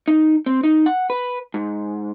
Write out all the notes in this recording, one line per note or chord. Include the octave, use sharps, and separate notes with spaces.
D#4
C4
D#4
F#5
B4
G#2